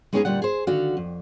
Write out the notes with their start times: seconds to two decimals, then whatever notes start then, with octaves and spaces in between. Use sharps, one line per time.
0.13 G#3 B3 C#4 D#4 F#4 G#4
0.25 D2 A#2 G3 F#5
0.42 G#4 C5
0.67 D3 D#3 F#4 F5
0.97 F2